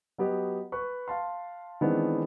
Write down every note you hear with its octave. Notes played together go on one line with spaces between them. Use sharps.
F#3 B3 G4 D#5
B4 C#6
F5 A5 C6
D#3 E3 G#3 B3 C4 D4